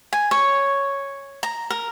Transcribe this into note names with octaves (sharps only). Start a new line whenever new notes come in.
G#5
C#5
A#5
A#4